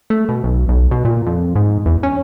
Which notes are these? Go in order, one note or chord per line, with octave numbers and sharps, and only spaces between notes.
A3
B2
B1
B1
B2
A#2
F2
G#2
E2
C#4